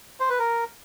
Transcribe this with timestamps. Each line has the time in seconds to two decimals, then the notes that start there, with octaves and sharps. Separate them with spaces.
0.20 C5
0.29 B4
0.39 A#4